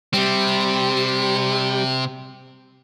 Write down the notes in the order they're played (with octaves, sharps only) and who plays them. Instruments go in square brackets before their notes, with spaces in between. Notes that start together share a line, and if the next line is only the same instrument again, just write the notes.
[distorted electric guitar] C3 C4 [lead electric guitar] G3